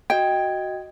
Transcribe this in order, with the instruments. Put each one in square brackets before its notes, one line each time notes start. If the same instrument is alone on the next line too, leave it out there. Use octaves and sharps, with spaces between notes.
[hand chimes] F#4 D#5 G#6 [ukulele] G5